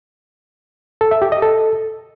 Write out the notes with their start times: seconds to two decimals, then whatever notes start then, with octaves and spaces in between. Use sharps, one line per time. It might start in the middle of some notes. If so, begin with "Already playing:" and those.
1.01 A4
1.11 E5
1.22 G4
1.32 D#5
1.42 A4